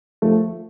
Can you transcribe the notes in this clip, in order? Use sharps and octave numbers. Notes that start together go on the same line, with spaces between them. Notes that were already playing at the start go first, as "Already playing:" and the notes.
F3 A3